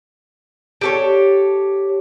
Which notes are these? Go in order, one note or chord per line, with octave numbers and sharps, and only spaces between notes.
G4 A4 C#5